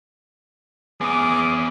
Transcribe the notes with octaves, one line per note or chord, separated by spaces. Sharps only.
B3 C#4 G#4 D6 D#6